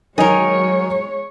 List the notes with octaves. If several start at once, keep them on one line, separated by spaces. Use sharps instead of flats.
D#3 F#3 G#3 D#4 G#4 A#4 C#5